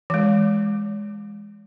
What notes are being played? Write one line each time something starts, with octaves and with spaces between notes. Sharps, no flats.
E3 G#3